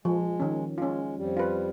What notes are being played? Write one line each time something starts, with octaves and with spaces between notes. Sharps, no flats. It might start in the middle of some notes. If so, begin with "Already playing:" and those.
F3 G#3
D#3 C#4
G#3 C#4 F4
F2 G3
F4 B4